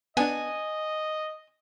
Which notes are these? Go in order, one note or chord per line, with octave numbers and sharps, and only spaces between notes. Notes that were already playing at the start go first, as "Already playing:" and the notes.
B3 D4 D#5 G#5